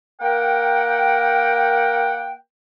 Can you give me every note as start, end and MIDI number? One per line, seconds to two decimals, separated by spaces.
0.21 2.34 58
0.21 2.34 70
0.21 2.34 78
0.21 2.34 79